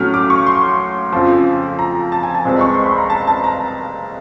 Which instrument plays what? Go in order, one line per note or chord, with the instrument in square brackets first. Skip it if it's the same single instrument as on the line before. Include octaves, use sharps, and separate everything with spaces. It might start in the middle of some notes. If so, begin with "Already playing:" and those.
Already playing: [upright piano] A2 F#3 A3 C#4 F6
D6
C#6
C6
F2 C#3 F3
A#5
A5
G#5
A5
C2 B2 G#3 C4
C#6
C6
B5
A#5
A5
A5
A#5